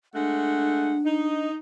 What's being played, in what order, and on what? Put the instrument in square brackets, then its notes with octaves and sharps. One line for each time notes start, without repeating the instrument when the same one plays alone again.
[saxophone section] G#3 A3 F#5 [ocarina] D4
[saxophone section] D#4